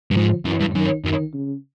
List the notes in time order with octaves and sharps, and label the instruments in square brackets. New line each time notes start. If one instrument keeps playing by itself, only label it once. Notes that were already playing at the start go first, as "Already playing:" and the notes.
[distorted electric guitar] G2
[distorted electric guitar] G#2 [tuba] F3
[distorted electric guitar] F#2 [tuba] E3
[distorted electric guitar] G2
[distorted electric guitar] F#2 [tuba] D#3
[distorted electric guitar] F#2 [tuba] D#3
[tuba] C#3